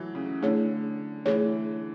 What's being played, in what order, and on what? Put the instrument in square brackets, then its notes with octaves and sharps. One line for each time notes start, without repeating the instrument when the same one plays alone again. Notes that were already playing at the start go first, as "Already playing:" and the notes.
Already playing: [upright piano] E3 F#3 A3
C#3
[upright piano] D3 [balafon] A3 E4 G#4 C#5
[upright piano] E3 [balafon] A3 E4 G#4 C#5